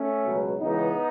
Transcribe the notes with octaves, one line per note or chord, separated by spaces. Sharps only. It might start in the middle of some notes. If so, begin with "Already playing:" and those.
Already playing: A3 C#4
C#2 B2 F#3
C#2 C#3 E3 B3 D#4